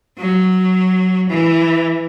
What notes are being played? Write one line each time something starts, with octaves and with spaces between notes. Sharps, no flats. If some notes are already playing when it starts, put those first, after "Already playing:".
F#3
E3